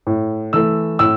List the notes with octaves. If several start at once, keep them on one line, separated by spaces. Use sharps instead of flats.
A2
E3 A3 E6
A2 E6